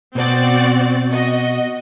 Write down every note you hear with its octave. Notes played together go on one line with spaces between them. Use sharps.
B2 C4 F#4 D5
F#4 D#5